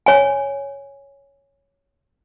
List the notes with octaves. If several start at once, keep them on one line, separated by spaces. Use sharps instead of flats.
C#5 G#5